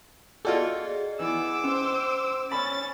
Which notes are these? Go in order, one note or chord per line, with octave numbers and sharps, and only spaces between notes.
F4 F#4 G#4 A4 D5 D#5
E3 B3 D6 E6
C#4 C5
C#4 B5 A6